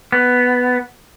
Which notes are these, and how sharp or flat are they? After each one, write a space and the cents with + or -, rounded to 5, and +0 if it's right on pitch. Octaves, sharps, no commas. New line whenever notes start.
B3 +5